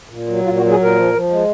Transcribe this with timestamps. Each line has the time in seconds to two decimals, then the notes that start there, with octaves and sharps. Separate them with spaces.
0.09 A#2
0.28 F#3
0.44 A#2 F4
0.57 F#4
0.62 F#3
0.70 G#4
0.79 A#2 A#4
0.96 F3
1.14 F3
1.30 G#3